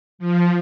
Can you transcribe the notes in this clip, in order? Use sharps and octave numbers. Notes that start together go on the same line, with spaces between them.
F3